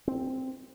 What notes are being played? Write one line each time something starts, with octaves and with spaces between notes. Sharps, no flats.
C4